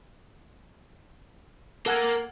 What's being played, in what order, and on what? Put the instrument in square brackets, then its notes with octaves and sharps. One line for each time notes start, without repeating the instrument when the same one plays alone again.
[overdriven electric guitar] A#3 [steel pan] A4 F#5 G#5